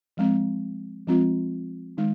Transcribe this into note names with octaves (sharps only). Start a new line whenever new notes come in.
F3 G#3 C4
F3 G#3 C4 F4
D#3 G#3 D#4